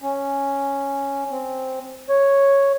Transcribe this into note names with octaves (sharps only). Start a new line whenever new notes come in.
C#4
C4
C#5